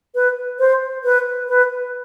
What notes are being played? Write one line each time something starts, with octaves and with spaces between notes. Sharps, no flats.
B4
C5
B4
B4